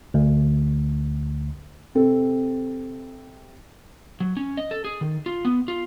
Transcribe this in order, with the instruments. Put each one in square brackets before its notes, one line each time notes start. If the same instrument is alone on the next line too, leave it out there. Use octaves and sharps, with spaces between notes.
[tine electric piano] D2
[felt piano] C3 C4 A4
[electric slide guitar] F#3
C#4
D#5
A4
G#4
D#3
F4
B3
F4